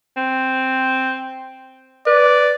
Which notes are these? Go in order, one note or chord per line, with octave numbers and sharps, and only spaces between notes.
C4
B4 D5